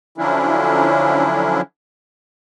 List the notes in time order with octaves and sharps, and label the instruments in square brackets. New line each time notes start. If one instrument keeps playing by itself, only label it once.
[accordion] D3 F3 F#3 C#4 D4 E4